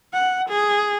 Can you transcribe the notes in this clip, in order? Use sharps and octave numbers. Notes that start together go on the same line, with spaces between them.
F#5
G#4